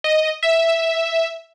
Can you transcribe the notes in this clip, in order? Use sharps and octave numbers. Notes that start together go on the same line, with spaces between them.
D#5
E5